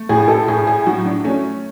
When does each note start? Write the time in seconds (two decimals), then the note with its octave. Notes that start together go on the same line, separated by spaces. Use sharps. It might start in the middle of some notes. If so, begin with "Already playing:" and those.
Already playing: A3
0.09 A2 G#4
0.28 A4
0.48 A2 G#4
0.67 G#4
0.86 F#3 F#4
1.06 D4
1.24 A3 C#4